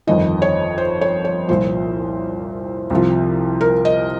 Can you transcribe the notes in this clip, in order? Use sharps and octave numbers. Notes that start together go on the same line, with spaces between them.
G1 F2 D#3 D#5
C#5
C5
C#5
C#5
C2 A#2 F3 C5
C2 C3 F3
A#4
D#5